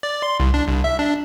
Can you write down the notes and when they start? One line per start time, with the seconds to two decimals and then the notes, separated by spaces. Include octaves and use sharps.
0.03 D5
0.22 C6
0.40 C2
0.54 D4
0.68 C2
0.84 E5
0.99 D4